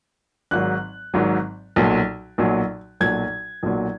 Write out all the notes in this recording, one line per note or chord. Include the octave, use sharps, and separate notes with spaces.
G#1 G#2 F#3 F#6
G#1 G#2 F#3
B1 A#2 F#3
B1 A#2 F#3
B1 A#2 F#3 G#6
B1 A#2 F#3